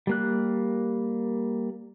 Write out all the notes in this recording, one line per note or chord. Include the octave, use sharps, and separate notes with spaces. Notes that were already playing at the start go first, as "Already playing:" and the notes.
G3 A#3 F#6